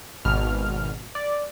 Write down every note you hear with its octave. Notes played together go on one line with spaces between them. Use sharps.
G#1 B2 F6
D5